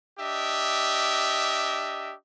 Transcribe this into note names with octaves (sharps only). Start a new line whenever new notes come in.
D4 G4 D#5 E5